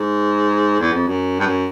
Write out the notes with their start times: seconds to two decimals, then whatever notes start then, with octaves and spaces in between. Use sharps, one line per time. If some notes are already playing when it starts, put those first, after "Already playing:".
Already playing: G#2
0.80 E2
0.93 F2
1.07 F#2
1.40 G2
1.46 F#2